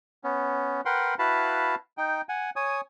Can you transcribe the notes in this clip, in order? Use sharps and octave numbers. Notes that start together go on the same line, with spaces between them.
B3 C#4
A#4 B4 F#5 G5 C6
E4 F#4 B4 F5 A5 B5
D#4 G5
F#5 G#5
C#5 G#5 D#6